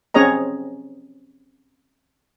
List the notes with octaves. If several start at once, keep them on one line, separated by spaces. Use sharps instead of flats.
C4 C#4 G#4 C#5 D#5 A#5